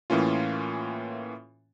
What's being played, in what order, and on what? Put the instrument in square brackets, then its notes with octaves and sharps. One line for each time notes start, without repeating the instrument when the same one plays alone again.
[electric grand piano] A2 E3 A#3 C#4 F4